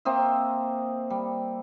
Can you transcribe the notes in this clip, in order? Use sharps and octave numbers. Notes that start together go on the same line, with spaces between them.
A#3 C4 D#5 E5
G3